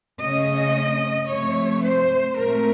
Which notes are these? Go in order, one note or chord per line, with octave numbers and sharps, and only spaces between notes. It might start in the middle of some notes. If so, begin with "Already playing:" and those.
C#3 A3 C#4 D#5
C3 F3 A3 C#5
C5
A#2 A3 C4 A#4